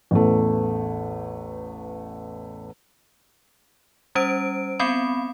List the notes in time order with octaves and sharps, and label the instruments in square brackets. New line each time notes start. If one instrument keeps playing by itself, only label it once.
[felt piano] A1 E2 A3
[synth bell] G3 C#4 C5 D7
B3 C4 F5 B5